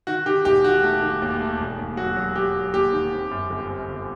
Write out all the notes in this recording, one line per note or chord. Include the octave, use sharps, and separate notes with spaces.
D#3 F#4
D#3 G4
E1 G4
D#3 F#4
A3
D#3
D#2
A3
E1
D#2
F#3 F#4
F#3
F#3 G4
F#3
D#2 G4
D#3
C4
F#2
G1
C4
G1